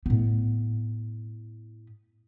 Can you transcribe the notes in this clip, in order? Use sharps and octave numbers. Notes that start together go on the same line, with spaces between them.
A2 B3